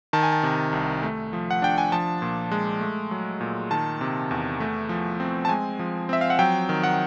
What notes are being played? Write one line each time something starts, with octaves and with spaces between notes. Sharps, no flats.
D#3 A5
G#5
A5
C3
C2
A3
F3
F#5
D4 G5
G#5
F3 A5
A#2
G#3
A3
F#3
A#2
D#3 A5
C3
E2
A3
F3
C4
A5
G#3 G#5
F3
C4 E5
F5
F#5
F#3 G5
D#3
F#5